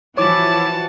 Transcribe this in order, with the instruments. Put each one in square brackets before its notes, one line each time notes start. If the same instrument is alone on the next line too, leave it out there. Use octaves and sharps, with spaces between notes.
[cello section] E3 F3 F#4 [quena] E4 [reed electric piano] C#5 D6 [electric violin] A5